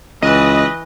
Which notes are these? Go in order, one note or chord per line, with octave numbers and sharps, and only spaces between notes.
C#2 E3 B4 D#5